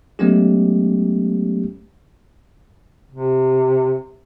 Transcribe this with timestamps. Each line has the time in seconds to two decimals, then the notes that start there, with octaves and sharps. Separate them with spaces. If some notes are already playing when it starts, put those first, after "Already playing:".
0.19 F#3 G#3 A3 B3 C#4 G4
3.12 C3